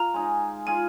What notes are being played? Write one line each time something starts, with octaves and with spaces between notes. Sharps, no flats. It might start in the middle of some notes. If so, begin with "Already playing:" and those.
Already playing: F4 A#5
G#3 D#4 G#4
G#3 F4 G#4 G#5